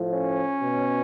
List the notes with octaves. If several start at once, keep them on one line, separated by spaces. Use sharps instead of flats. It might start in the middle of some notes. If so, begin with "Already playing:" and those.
Already playing: A2 F3
C#4
B2